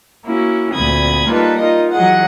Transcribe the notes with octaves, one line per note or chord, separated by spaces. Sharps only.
A#3 C#4 E4 F#4
D2 A#2 C4 B5 D#6 G#6
G3 A#3 D#4 F4 A4 B4
D#4 F4 A#4 D#5
E3 F#3 G#4 D#5 F#5